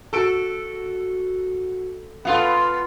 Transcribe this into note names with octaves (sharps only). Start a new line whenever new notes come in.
F#4 A4 D7
B3 F4 A4 F5 F#5